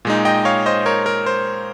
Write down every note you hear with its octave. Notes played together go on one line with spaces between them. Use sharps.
A#2 G#3 D#4
D#5 G5
C#5 F5
C5 D#5
A#4 C#5
A#4
C5